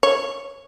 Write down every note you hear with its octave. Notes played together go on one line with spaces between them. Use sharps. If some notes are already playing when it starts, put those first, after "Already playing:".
C#5